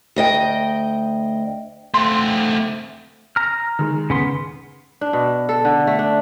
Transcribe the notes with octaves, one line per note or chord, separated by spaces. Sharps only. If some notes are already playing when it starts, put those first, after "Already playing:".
D2 D#5 G5
A3 C4 C6
A#5 F6
D#3 G#3
C#3 B3 C6
D4
B2
A4
D3
A3
D4